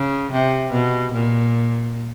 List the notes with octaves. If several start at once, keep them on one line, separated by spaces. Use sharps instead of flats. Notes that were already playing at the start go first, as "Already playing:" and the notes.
Already playing: C#3
C3
B2
A#2